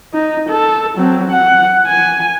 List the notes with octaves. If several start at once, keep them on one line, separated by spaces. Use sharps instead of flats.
D#4
A4
F#3 C4
F#5
G#5